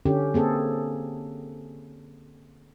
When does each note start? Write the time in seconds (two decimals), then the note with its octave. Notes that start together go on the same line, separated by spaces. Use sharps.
0.06 D3 C#4 G4
0.34 A#3 C4 G#4 A4